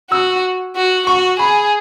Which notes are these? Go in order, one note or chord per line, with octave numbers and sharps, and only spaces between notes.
F#4 E6
F#4
F#4 C#6
G#4 B5